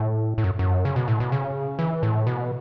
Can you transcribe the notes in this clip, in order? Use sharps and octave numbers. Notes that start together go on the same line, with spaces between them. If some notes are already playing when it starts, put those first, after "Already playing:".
Already playing: A2
A2
F#2
F#2
C#3
B2
A2
B2
C#3
E3
A2
B2